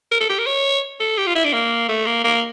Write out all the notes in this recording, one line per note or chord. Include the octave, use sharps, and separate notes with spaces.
A#4
A4
G4
A#4
C#5
A4
G4
F4
E4
D4
A#3
A3
A#3
A#3